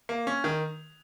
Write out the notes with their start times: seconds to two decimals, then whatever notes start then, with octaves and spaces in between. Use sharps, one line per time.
0.09 A#3
0.27 C#4
0.44 D#3